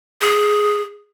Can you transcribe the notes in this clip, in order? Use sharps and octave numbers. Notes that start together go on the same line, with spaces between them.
G#4